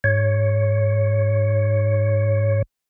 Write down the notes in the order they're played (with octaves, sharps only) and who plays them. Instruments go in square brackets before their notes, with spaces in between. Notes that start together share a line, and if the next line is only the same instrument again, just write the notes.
[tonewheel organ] G#2 C#5